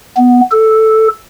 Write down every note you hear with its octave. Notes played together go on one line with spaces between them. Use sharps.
B3
A4